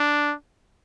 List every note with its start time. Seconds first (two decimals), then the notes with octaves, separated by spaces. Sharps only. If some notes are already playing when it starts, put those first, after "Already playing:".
Already playing: D4